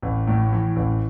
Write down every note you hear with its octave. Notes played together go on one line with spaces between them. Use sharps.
A1
A2
E3
A1